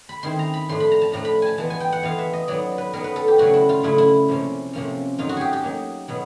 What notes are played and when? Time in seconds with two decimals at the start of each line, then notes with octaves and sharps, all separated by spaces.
0.09 B5
0.23 D#3 G#3 C4 E4 C6
0.39 A#5
0.54 B5
0.69 A2 F3 A3 D4 C6
0.80 B5
0.91 A#5
1.02 A5
1.12 A2 F3 A3 D4 A#5
1.25 B5
1.42 G#5 A5
1.58 E3 G#3 B3 A5
1.70 G#5
1.80 G5
1.92 F#5
2.03 E3 G#3 B3 F5
2.19 E5
2.33 D#5
2.48 F#3 B3 D#4 D5
2.78 B4
2.93 F#3 B3 D#4 A#4
3.04 B4
3.16 A4
3.28 G4
3.38 C#3 F#3 A3 D4 F#4
3.53 E4
3.69 F4
3.83 C#3 F#3 A3 D4 E4
3.98 E4
4.28 C3 F3 A#3 C#4
4.73 C3 F3 A#3 C#4
5.18 F#3 A#3 D#4 F4
5.29 F#4
5.37 G4 G#4
5.53 G4
5.63 F#3 A#3 D#4
6.08 B2 F#3 B3